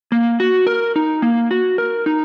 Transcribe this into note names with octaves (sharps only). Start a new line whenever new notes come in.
A#3
F#4
A#4
D#4
A#3
F#4
A#4
D#4